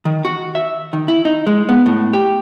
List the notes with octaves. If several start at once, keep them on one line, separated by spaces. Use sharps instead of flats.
D#3
F#4
E5
D#3
E4
D#4
G#3
B3
A2
G4